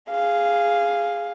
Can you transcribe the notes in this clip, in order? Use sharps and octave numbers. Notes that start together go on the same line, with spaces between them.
G#4 F5